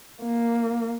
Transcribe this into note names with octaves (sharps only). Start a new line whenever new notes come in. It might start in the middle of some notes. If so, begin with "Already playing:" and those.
A#3